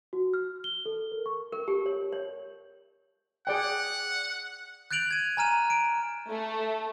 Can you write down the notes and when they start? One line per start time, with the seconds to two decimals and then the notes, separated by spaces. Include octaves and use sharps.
0.13 F#4
0.34 F6
0.64 G7
0.86 A4
1.12 A#4
1.26 C#6
1.52 A#4
1.68 G4
1.86 C#5
2.13 C#5
3.47 G#4 D5 F#5 G5
4.91 F#6 G6 A6 D7 F7 F#7
5.11 G#6 D#7
5.37 G#5 A#5 F6 D#7 E7
5.70 D7
6.29 A3